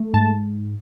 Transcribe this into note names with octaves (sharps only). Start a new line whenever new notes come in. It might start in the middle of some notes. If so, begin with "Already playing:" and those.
Already playing: A3
G#2 A5